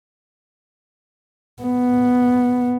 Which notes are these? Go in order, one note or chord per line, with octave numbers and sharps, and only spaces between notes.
B3